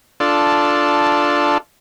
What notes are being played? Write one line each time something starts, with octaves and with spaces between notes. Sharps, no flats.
D4 F4 A4